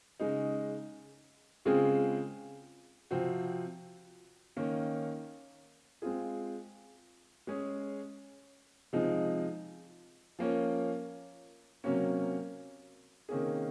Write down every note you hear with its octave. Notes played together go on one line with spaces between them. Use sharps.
C#3 G#3 D#4
C#3 G#3 C4 F4 G#4
C3 F3 C4 F#4
D#3 A#3 C#4
G#3 C4 F4 G#4
G#3 C#4 G#4
C3 F3 G#3 D#4
F3 A#3 C#4
C3 F#3 A#3 C#4
C3 D#3 A#3 C#4 G#4